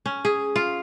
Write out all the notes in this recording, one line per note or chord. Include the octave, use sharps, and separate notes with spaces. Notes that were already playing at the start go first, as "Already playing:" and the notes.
C#4
G#4
F4